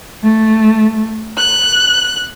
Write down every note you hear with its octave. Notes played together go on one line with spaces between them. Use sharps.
A3
F#6